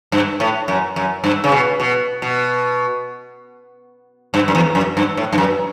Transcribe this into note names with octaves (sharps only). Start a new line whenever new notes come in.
G2
A2
F#2
F#2
G2
C#3
B2
B2
B2
G2
F#2
E2
F#2
G2
A2
G2
F#2